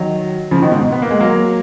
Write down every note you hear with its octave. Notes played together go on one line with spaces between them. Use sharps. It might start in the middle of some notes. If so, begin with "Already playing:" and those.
Already playing: D#3 F#3
C#3 F3
B2 D#3
G#2 B2
B3
A#3
G#3
F#3 A#3